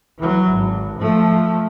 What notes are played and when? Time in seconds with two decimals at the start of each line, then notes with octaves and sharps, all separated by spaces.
0.19 E3 F#3
0.51 G#1
1.00 F3 A3